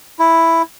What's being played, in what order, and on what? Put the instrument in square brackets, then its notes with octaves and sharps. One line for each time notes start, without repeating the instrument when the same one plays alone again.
[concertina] E4